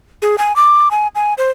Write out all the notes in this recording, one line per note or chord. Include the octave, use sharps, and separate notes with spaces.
G#4
G#5
D6
G#5
G#5
C5